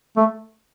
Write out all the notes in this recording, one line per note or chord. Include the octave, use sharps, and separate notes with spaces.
A3